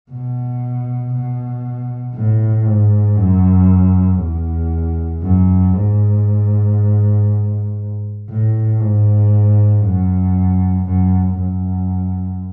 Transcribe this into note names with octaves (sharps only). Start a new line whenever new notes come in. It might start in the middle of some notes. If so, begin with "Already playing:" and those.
B2
B2
A2
G#2
F#2
E2
F#2
G#2
A2
G#2
F#2
F#2
F#2